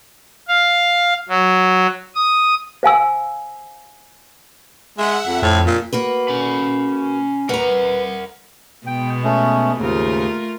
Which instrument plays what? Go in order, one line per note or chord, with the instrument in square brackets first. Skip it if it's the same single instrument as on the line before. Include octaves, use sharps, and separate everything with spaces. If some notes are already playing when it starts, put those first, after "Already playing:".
[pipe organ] F5
F#3
D#6
[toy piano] C5 F5 G#5 E6
[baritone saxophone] G#3 [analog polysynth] E5 F#5
[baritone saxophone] F2
[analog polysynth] F2 [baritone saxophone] A2
[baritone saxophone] A#2
[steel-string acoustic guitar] A#3 F#4 B4
[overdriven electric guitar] C#4 B5
[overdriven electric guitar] A#4 F#5 [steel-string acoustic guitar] B4 A#5
[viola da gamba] B2 G#3 B3 [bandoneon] G5
[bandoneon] A3 C#4
[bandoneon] D#2 G#2 C#3 [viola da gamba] A3 F4 A#4